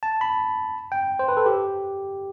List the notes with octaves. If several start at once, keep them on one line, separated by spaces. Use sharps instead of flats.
A5
B5
G5
C5
B4
A4
G4